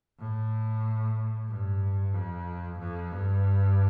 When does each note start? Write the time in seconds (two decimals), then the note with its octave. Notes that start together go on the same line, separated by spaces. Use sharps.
0.19 A2
1.49 G2
2.14 F2
2.79 F2
3.12 G2